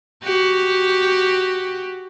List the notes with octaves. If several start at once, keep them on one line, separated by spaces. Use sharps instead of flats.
F#4 G4